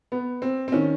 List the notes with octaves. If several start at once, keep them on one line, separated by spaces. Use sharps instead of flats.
B3
C4
C4
D#3 C#4